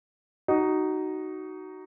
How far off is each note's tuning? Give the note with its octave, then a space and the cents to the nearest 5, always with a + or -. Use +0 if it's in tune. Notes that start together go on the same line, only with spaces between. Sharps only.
D#4 -5 F#4 +20